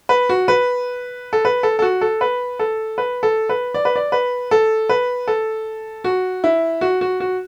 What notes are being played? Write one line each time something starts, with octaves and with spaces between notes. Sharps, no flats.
B4
F#4
B4
A4
B4
A4
A4
F#4
A4
B4
A4
B4
A4
B4
D5
B4
D5
B4
A4
B4
A4
F#4
E4
F#4
F#4
F#4